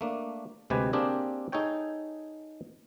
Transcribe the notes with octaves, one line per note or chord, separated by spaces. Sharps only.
A3 A#3 D4
D2 C3 G#3 G4 B4 G#5
A#3 C4 D4 G4 G#4 A#4
D#4 G#4 A4 C#5 G5